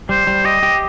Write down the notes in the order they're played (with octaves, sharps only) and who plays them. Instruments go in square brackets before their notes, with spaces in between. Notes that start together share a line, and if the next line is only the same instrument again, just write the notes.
[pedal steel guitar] G3 [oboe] C5
[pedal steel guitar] G3
[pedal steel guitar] G4 [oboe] D#5
[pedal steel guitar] G4